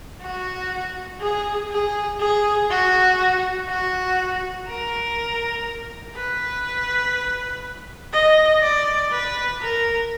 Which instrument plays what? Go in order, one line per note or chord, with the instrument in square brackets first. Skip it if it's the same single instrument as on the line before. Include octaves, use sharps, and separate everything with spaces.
[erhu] F#4
G#4
G#4
G#4
F#4
F#4
A#4
B4
D#5
D5
B4
A#4